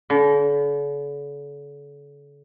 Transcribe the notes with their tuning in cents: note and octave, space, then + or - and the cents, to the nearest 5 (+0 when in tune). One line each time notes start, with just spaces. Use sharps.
D3 -45